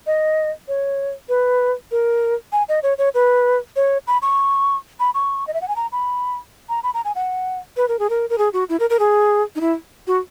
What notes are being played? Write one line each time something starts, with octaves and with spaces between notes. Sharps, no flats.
D#5
C#5
B4
A#4
G#5
D#5
C#5
C#5
B4
C#5
B5
C#6
B5
C#6
D#5
E5
F#5
G#5
A#5
B5
A#5
B5
A#5
G#5
F#5
B4
A#4
G#4
A#4
A#4
G#4
F#4
E4
A#4
A#4
G#4
D#4
E4
F#4